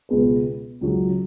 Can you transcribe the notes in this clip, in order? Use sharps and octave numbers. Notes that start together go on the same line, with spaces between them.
C#2 B2 B3 G#4 B4
C#2 C#3 F#3 C#4